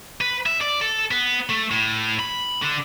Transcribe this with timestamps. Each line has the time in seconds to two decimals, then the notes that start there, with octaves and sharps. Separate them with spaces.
0.21 B4
0.46 E5
0.61 D5
0.81 A4
1.11 B3
1.49 A3
1.71 A2
2.19 B5
2.62 D3